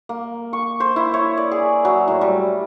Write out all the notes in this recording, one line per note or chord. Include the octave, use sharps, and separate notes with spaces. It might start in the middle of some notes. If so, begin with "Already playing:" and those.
A#3
C#6
C5
E4
C#5
D5
G#4
F#3
A2
G3